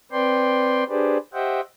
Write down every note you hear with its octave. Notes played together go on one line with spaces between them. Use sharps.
C4 B4 D5 G5 C6
D4 G4 G#4 B4 C5 D5
G4 C5 D#5 E5 F#5 G5